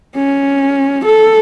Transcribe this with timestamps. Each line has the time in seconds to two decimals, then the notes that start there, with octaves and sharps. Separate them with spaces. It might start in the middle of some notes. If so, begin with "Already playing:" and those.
0.16 C#4
1.05 A4